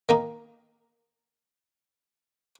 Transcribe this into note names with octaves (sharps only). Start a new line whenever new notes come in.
D#3 A#3 D#4